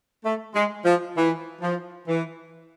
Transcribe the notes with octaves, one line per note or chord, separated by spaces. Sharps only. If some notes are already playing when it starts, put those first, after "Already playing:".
A3
G#3
F3
E3
F3
E3